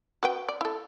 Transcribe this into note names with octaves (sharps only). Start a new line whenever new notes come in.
F#4 B4 G5
D5
E4 A4